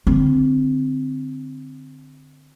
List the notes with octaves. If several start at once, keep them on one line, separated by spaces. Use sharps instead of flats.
D3 C4